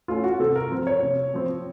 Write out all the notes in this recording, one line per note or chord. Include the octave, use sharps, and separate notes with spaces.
A3 C#4 F4
F#4
C3 A4
A#4
F3 C4
C#5
C3
F3 C4